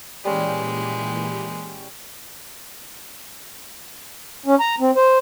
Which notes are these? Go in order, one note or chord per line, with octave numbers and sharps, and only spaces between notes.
A#2 E3 G3 G#3 C#4 G4
C#4
A#5
C4
C5